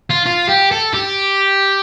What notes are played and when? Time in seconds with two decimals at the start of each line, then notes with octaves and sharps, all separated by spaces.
0.10 F4
0.26 F4
0.49 G4
0.72 A4
0.94 G4